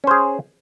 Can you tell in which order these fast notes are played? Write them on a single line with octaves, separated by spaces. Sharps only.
C#4 C5 G#4